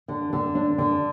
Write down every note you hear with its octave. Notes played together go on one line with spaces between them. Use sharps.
D3
D3
D4
D3